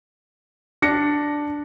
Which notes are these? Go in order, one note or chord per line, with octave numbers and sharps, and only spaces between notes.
D4 A#6 C#7